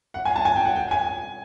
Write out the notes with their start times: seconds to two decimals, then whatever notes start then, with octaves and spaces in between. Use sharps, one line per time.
0.14 F#5
0.25 G#5
0.36 A5
0.45 G#5
0.56 G5
0.65 F#5
0.76 G5
0.91 G#5